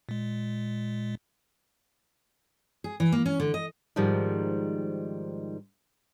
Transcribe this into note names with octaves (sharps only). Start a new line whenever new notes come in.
A#2 G#3
G#4
E3
A#3
C#4
D3
D#5
G#2 D#3 F3 G3 G#3